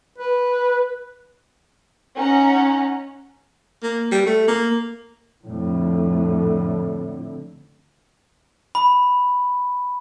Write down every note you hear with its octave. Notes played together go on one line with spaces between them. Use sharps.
B4
C#4 D#4 F#5 A#5
A#3
G3
A3
A#3
F2 A2 D3
B5